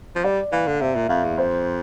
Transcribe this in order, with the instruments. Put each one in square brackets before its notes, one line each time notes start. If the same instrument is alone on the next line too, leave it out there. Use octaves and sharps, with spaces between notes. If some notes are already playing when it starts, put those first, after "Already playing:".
[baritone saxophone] F3
[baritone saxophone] G3 [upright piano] D5
[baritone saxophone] E3 [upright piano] F5
[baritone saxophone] D3
[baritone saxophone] C3 [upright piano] E5
[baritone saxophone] A#2
[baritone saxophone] F2 [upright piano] F5
[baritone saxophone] E2
[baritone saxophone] F2 [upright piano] C5